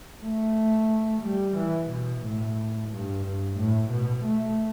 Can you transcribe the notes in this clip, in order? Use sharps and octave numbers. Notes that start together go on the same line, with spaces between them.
A3
G3
E3
B2
A2
G2
G2
A2
B2
A3